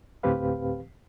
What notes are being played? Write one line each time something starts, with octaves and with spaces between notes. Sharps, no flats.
D2 A2 C4 G4 B4 F5